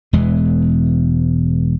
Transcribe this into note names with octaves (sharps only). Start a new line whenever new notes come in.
E1 E2 E3 G#3